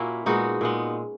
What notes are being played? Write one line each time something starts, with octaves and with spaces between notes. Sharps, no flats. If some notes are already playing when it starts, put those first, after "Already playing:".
Already playing: A#2 A#3 C#4 E4 F#4
A#2 G#3 B3 D#4 F#4
A#2 G#3 B3